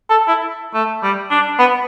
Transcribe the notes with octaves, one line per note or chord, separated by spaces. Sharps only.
A4
E4
A3
G3
D4
B3